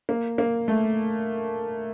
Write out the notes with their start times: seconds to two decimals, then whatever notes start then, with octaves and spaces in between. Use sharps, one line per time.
0.09 A#3
0.38 A#3
0.68 A3